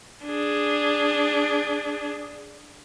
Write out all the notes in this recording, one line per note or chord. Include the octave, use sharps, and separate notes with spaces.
D4 G#4